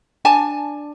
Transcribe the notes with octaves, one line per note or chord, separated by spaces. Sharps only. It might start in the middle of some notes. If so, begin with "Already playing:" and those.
D4 G#5 A5